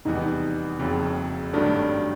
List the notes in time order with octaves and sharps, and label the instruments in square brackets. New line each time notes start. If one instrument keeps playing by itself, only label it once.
[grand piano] F1 E2 B2 G3 B3 [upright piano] D#4
[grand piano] F#1 F2 C#3 F#3
[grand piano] G#1 G2 D#3 F#3 A3 [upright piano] D4